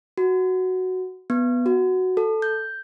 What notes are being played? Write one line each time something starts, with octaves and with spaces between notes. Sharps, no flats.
F#4
B3
F#4
A4
G6